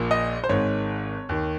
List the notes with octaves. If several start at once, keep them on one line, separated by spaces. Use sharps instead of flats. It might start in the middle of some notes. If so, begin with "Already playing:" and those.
Already playing: A#1 A#2
D#5
C5
G#1 G#2 D#3 C#5
D#2 D#3